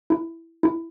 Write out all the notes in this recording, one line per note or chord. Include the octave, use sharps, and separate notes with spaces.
E4
E4